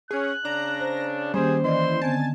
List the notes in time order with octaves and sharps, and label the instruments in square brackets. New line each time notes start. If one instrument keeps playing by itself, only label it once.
[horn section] C#4 [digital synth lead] G#4 [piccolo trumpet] F#6
[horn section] C#3 D4 [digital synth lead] A#5
[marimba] C5
[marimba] D#3 A#3 C#4 [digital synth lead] G3 [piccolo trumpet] G#4 [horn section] C5
[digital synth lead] E3 [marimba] D5 D#5 [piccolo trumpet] C6
[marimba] D3 B3 C4 [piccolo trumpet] G#5 [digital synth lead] A5